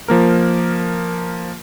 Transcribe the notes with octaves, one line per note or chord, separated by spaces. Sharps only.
F3 A#3 A#4